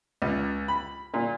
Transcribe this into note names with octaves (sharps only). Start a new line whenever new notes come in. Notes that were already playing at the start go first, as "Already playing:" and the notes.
C#2
B5
A#2